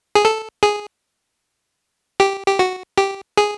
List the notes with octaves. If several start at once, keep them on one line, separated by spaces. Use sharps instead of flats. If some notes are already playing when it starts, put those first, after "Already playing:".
G#4
A4
G#4
G4
G4
F#4
G4
G#4